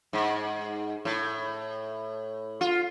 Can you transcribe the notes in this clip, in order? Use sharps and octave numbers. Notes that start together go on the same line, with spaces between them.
G#2
A2
F4